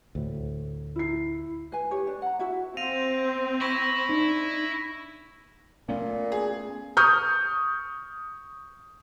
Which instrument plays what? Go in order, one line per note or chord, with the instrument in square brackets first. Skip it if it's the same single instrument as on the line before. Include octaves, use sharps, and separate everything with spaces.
[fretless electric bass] D2 A2
[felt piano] E4 C7
[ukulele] B4 G#5
G4 C#5
D4
F#5 A#5
E4 F#4 E5
[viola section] C4 [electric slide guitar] F5 [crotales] A#6 D#7 F7
[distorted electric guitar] E4 [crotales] C#6 A#6 D#7
[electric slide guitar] D4 D#4
[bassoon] A#2 [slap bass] A3 B3 C#4
[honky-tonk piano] G#4
[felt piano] C#6 D#6 F6 G6